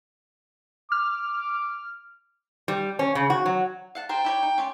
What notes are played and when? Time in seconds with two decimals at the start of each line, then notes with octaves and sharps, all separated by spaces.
0.92 D6 F6
2.68 G3
2.99 C#4
3.15 C#3
3.30 F#4
3.46 F#3
3.95 F5 F#5 A5
4.09 A#4 C5 G5 A5
4.25 E4 G4 C#5
4.43 D#4
4.58 C#4 F4 G4